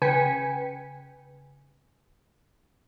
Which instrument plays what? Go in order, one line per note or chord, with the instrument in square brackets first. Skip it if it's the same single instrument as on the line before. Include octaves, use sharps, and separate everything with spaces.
[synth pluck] C#3 B4 G5 G#5 B6 C#7